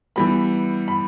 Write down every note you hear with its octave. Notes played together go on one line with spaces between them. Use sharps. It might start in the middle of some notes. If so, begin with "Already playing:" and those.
E3 G3 B3 B5
B5